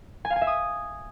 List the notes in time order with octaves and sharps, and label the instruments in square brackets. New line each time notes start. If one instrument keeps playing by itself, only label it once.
[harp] G#5
F5
G#5
E5
D#6